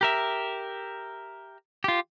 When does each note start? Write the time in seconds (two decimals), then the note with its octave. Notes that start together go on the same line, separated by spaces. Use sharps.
0.01 G4 A#4 E5
1.84 F4 G4